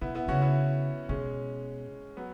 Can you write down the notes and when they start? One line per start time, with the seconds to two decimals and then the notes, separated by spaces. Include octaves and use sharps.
0.01 B2 B3 E4
0.15 B3 E4
0.28 C#3 C#4 F#4
0.42 B3 E4
1.09 B2 G#3 C#4
2.17 F#3 B3